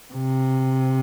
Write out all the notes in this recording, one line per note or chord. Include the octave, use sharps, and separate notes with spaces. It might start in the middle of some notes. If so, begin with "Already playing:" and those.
C3